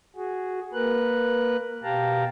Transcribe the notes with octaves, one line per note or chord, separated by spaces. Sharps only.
F#4 G#4
A#3 A#4 B4 F#6
B2 G4 F5 G5 A5 A#5